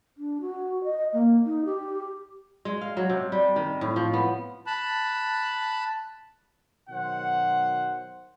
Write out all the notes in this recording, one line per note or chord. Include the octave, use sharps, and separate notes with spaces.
D4
F#4
D#5
A#3
D#4
G4
G#3
F5
F#3
C3
G3
D#3
A2
F3
B3
A5 B5 F#6
B2 D#3 F#3 C5 F#5